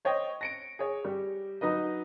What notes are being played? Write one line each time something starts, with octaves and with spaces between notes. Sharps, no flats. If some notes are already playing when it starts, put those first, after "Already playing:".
C5 C#5 D#5 G5
A#6 C#7 D7
G#4 C#5
G3 G4
F#3 D#4 B4 D#5